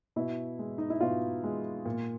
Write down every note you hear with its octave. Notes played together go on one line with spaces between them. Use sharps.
B2 E4
G#3
D#4
E4
B2 F4
G#3
A#2